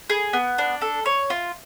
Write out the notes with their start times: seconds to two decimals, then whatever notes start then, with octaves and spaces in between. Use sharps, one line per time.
0.10 G#4
0.33 B3
0.58 D4
0.81 A4
1.06 C#5
1.30 F4